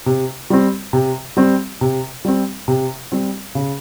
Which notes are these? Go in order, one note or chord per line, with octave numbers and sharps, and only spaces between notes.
C3
G3 C4
C3
G3 C4
C3
G3 C4
C3
G3 C4
C#3